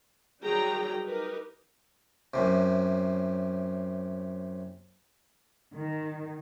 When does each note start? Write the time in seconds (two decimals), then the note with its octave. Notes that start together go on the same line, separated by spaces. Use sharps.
0.43 D#3 F#3 G3 G#4 G5 A#5
1.04 D#4 G4 A#4 B4
2.34 F#2 A2 C3
5.76 D#3